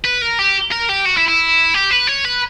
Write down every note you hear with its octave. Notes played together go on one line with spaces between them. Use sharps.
B4
A#4
G4
A#4
G4
F#4
E4
E4
G4
B4
C#5
B4